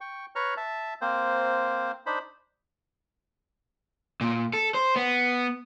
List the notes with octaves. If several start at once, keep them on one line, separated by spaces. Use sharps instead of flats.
G5 C#6
B4 C#5 A#5 C#6 F6
E5 A5
A#3 C4 C5
D4 D#4 C5 B5
A#2
A4
C5
B3